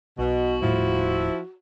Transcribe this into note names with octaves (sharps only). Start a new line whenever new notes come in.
B1 B2 F#4
D#1 A2 F3 G3 E4